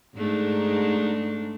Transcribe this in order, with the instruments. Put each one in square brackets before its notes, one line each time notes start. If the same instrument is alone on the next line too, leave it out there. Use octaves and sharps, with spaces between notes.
[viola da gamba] G#2 A3 D4